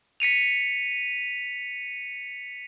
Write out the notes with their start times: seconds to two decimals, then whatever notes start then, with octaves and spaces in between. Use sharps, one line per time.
0.20 B6 C#7 D#7 F7